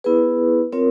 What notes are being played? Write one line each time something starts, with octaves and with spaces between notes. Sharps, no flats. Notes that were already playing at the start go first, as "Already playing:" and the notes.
B3 E4 G#4 B4
C4 F4 A#4 C#5